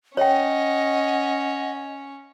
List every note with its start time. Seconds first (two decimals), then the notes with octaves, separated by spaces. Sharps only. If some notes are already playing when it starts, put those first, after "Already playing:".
0.17 C#4 C#5 D#5 F#5 G5